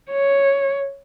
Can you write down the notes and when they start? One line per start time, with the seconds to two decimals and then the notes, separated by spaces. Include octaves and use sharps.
0.11 C#5